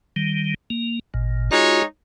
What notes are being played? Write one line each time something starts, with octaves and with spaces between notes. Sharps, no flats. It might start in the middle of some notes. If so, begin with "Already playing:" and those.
D#3 G3
A#3
G#1 A#2
G#3 D#4 F4 F#4 C#5